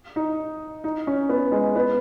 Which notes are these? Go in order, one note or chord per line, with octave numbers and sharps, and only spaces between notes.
D#4
D#4
C#4
B3
G#3
B3